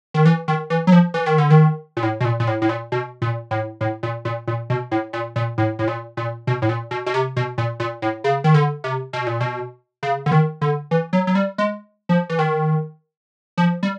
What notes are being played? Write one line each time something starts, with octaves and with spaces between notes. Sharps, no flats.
D#3
E3
D#3
E3
F#3
F3
E3
D#3
D3
D#3
A#2
A2
B2
A#2
A#2
A2
A2
A#2
B2
A#2
A2
A2
A#2
A#2
A#2
B2
A2
A#2
A#2
A2
A2
A#2
A#2
B2
A2
A#2
B2
B2
C3
B2
A#2
A#2
A2
C#3
D#3
D3
C3
B2
A#2
B2
C#3
D3
D#3
D3
E3
F#3
F#3
G3
G#3
F3
E3
D#3
F3
G3